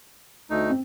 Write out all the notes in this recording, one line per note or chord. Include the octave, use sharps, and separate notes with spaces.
D2 A3 D#4
C4